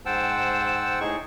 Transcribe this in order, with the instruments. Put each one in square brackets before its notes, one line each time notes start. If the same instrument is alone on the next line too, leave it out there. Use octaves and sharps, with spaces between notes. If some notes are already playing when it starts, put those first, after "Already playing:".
[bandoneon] G#2 C5 F#5 G5 A5 E6
A2 D#4 G#4 C#6